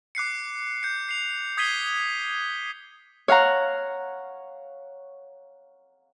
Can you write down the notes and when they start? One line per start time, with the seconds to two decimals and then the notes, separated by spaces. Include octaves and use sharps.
0.15 D6 F#6 C7 C#7
0.83 G6 C#7
1.09 C7 F7
1.57 D#6 G#6 B6 C7 D#7 G7
3.28 C#5 F5 F#5 A#5